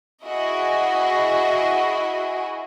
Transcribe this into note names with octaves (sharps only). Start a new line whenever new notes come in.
E4 F#4 G#4 D#5